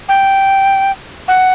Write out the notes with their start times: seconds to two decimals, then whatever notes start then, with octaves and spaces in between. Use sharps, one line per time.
0.09 G5
1.28 F#5